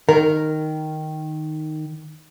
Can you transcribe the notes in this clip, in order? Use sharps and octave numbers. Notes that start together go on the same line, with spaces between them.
D#3 A#4